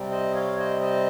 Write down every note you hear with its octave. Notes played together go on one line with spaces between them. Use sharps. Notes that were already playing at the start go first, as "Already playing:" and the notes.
Already playing: C3 G3 C4
C5 D#5
C#5 F5
C5 D#5
C5 D#5